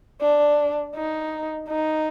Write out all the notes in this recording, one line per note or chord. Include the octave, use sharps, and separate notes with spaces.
D4
D#4
D#4